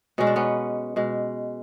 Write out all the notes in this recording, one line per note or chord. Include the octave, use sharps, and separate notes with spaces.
B2 G#3 C#4
D4
B3 C#4
B2 G#3